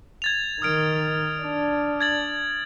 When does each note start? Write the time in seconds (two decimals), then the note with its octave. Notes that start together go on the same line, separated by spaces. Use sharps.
0.22 G#6 A6 F7
0.62 D#3 D#6 F6 D7
1.42 D4
2.01 G#6 A6 F#7